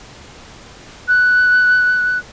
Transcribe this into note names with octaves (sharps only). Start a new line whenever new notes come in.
F#6